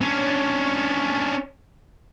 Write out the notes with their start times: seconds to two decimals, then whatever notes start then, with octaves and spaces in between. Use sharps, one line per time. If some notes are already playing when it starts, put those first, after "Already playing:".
0.01 C#4 D4